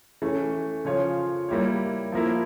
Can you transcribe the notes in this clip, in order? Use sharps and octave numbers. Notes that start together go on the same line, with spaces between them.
E3 A3 C#4
C#3 F3 C#4 F4 C#5
G3 A#3 E4 G4 C#5
F3 A#3 E4